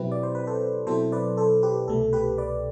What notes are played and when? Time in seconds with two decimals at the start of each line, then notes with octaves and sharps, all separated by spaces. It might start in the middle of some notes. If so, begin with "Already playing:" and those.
Already playing: B2 F#3 C4 E4 G4 B4
0.12 D5
0.23 C5
0.35 B4
0.47 A4 C5
0.87 B2 F#3 C4 E4 A4 C5
1.12 B4 D5
1.37 A4 C5
1.63 G4 B4
1.88 C2 B2 A3 A4
2.13 G4 B4
2.38 B4 D5